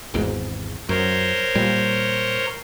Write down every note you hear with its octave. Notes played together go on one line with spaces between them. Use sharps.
G#1 E2 G#2
F#2 A#4 C5 C#5
A#2 G3